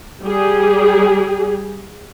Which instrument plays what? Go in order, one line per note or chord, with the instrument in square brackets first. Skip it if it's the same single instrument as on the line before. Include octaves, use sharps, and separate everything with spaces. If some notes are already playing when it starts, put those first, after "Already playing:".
[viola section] G3 G4 G#4